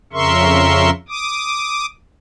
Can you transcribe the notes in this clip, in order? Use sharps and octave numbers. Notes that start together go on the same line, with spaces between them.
F2 C#3 A#4 E5 C6 C#6
D6 D#6